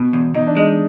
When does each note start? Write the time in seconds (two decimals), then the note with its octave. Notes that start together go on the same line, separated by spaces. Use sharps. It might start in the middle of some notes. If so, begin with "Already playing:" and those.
Already playing: B2
0.13 E2
0.34 E2 D#4
0.47 D4
0.57 G#3 D#4